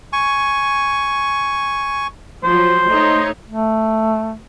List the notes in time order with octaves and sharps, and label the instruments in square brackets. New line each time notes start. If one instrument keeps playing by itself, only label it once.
[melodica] G#5 C#6
[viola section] F3 F#3 [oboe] C5
[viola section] A3 D#4 C#5
[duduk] A3